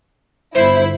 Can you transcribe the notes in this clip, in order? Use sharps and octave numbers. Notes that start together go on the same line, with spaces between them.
G1 E4 C5